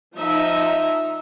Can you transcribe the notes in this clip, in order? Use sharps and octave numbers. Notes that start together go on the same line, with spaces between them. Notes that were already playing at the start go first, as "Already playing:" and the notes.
F3 D#4 E5 A#5